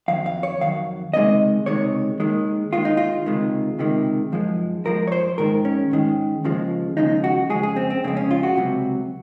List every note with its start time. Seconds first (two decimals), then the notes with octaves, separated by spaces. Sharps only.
0.08 F2 D#3 F#3 F5
0.26 F5
0.43 C#5
0.60 F2 D#3 F#3 F5
1.14 C#2 C3 D#3 G#3 D#5
1.66 C#2 C3 D#3 G#3 C#5
2.20 D#2 D#3 G#3
2.73 D#2 D#3 G#3 F4
2.85 D#4
2.97 F4
3.26 C#2 C3 D#3 G#3
3.79 C#2 C3 D#3 G#3
4.32 F#2 F3 G#3
4.85 F#2 F3 G#3 A#4
5.07 C#5
5.12 C5
5.38 G#2 D#3 G#3 A#4
5.65 C#4
5.91 G#2 D#3 G#3
6.44 D#2 C#3 F3 G#3
6.97 D#2 C#3 F3 G#3 D#4
7.24 F#4
7.50 F2 C#3 G#3 G#4
7.63 G#4
7.76 C4
7.90 C4
8.04 F2 C#3 G#3 C4
8.17 C#4
8.31 F4
8.43 F#4
8.56 C#2 C3 F#3